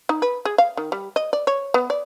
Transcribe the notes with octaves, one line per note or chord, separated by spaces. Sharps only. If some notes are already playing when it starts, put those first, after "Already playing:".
D#4
B4
G#4
F5
D#3
G3
D#5
D5
C#5
B3
D5